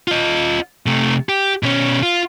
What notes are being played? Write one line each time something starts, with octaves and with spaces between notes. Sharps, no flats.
F4 D#5
C3 A3
G4
B2 C#4
F4